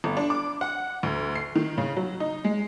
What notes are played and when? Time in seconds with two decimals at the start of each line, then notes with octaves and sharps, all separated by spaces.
0.04 G1
0.17 D4
0.30 D6
0.61 F#5
1.03 D2
1.36 C7
1.55 D#3
1.78 C#3
1.96 F#3
2.20 D#4
2.44 G#3